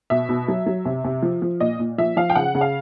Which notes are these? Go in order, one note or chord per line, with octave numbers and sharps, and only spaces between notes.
B2 E5
B2
F#3
F#3
C3
C3
F3
F3
A#2 D#5
A#2
F3 E5
F3 F5
G5
C#3 F#5
C#3
F5